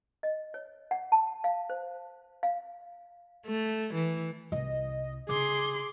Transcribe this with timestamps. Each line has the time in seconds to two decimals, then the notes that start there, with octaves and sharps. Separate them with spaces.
0.23 D#5
0.54 C#5
0.91 F#5
1.12 A5
1.44 F5
1.70 C5
2.43 F5
3.46 A3
3.94 E3
4.52 C2 E4 D#5
5.29 C#3 G#4 C6 D6